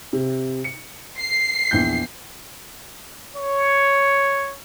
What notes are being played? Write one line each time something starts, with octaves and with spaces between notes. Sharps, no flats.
C3
C#7
C7
A#1 E2 G6
C#5